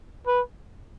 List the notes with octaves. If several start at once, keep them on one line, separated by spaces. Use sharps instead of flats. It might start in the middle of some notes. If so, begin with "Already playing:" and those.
B4